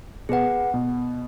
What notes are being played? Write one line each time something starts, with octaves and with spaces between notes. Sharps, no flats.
B2 G#4 B4 F#5
B2